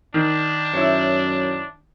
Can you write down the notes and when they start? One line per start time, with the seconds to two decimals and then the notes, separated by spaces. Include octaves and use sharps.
0.14 D#3 D4
0.74 F#2 E4 C#5